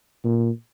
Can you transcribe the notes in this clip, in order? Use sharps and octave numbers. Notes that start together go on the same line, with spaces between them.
A#2